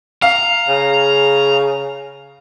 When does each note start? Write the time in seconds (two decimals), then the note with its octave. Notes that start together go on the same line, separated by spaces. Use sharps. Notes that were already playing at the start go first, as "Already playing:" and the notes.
0.22 F5 A#5
0.68 C#3